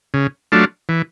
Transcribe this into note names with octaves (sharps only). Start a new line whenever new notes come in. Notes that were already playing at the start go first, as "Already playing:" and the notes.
C#3
F#3 A3 D4 F4
E3